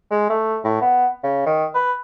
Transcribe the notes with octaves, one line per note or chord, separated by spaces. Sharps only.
G#3
A3
A2
B3
C#3
D#3
B4